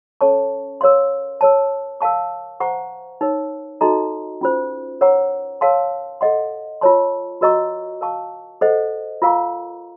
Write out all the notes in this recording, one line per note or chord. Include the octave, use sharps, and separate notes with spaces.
C#4 A4 C#5 A5 C#6
A#4 C#5 F5 C6
A#4 C#5 A5
A#4 F5 A5 C#6
C5 F#5 A#5 C#6
D#4 A#4 C#5
D#4 F#4 A4 D#5 A#5
C#4 F4 C5
A#4 C#5 F#5 A#5 C#6
A#4 C#5 F5 A5 C6
A4 D#5 F#5 C6
F4 A#4 C#5 A5 C6
F#4 A#4 D#5 A#5 C#6
A#4 F5 A5 C#6
A4 C5 D#5 F#5
F4 A#4 F5 A#5 C#6